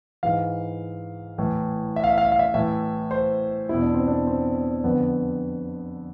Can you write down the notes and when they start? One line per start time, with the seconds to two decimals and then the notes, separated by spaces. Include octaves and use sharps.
0.23 G#2 E3 F5
1.38 A2 E3
1.96 E5
2.04 F5
2.10 E5
2.18 F5
2.25 E5
2.32 F5
2.39 E5
2.54 A2 E3 E5
3.11 C5
3.69 E2 B2 E4
3.82 D4
3.94 C4
4.08 D4
4.27 C4
4.84 F2 D3 B3